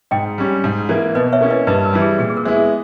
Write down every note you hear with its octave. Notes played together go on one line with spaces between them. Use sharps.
G#2 D#5 G5
G3 C#4
G#2
E3 A#3
B2 B4 D#5
C#5 E5
A#3 C#4 E4
B4 D#5
G2 B4 D#5
A#4
E3 G3
G#4
A#2 G#4
G#4
A#4
G#3 B3 E4
G#4